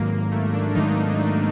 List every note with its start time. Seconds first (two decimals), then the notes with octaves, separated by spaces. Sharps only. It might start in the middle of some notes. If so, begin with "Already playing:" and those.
Already playing: G#2 D#3 F#3 A#3
0.32 A3
0.54 D4
0.75 G#2 D#3 F#3 D#4
1.19 D4